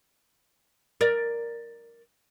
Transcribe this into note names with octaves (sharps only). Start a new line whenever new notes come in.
A#4 D5